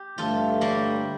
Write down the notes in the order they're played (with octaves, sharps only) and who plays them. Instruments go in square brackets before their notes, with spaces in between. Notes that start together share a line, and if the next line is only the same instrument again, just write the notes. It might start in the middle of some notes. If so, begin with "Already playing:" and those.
Already playing: [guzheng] G4
[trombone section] G2 D3 A3 [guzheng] F4 A4
[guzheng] G3 A#3